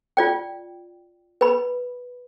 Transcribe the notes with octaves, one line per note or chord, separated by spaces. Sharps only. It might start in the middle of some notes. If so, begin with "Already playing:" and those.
F4 D5 G5
B4 B5